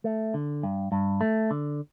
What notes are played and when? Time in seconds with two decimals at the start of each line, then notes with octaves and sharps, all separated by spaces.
0.04 A3
0.34 D3
0.63 G2
0.92 G2
1.21 A3
1.51 D3